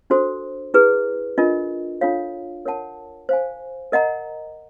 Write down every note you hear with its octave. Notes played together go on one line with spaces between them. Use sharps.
D4 F#4 A4 C5
E4 G#4 B4
D4 F4 A#4 D#5
D4 F4 A4 C#5 F5
A#4 C#5 F#5 A5
C5 F5 G#5
A#4 D#5 F#5 A#5